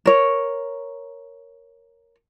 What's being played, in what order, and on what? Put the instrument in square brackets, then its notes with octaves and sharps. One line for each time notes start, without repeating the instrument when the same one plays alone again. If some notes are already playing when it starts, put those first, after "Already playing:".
[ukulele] A#4 C#5